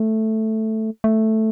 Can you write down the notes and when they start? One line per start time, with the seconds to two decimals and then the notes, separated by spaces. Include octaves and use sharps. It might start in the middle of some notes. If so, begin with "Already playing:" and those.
Already playing: A3
1.04 A3